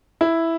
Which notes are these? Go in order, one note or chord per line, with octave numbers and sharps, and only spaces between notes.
E4